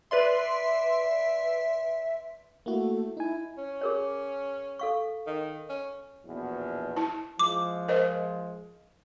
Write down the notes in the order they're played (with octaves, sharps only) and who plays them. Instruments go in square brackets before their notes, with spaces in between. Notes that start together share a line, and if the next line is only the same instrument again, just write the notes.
[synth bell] B4 D5 C6 [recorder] E5
[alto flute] A3 [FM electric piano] A#3 E4 F#4
[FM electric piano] D#4 G#5 [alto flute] E4
[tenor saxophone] C#4
[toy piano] G#4 A#4 C#5
A4 F5 C#6
[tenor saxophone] D#3
C#4
[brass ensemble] A#1 E2 B2
[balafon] E4 A5
[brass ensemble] F3 G#3 [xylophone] D6
[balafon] A#4 C5 D#5